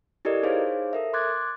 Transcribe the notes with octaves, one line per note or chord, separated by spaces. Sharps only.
E4 G4 A4 A#4 D5 D#5
D#4 G#4 C5 C#5 F5
A4 A#4 E5
C6 D6 F#6 G#6 A6